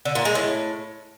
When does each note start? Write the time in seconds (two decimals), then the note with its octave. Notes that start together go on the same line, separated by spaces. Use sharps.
0.05 D3
0.15 A#2
0.25 G#3
0.35 A2